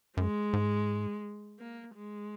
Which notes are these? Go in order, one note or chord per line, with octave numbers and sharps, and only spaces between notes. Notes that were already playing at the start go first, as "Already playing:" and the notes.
F#2 G#3
G#2
A#3
G#3